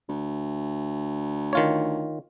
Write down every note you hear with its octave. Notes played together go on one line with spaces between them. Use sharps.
D2
D#3 F4 C#5